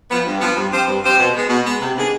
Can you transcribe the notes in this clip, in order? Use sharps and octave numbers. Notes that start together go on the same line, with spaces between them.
F3 B3
G2
F3 B3
G2
F3 C4 G4 C5
G2
F3 C4 G4 C5
B2
G#3 B3
B2
G#3 B3
C3
D#3 B3 D4 G#4